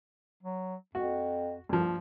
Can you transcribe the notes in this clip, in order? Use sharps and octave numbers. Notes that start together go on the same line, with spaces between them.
F#3
F2 F#4
C2 G2 F3